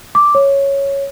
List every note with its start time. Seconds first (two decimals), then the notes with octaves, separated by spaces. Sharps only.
0.15 D6
0.35 C#5